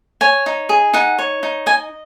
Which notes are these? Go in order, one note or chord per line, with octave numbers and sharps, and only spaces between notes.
C#5 G#5
D#4
G#4
D#4 F#5
C#5
D#4
D#5 G#5